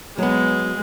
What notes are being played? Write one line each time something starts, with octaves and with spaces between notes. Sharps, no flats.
F#3 G#3 B3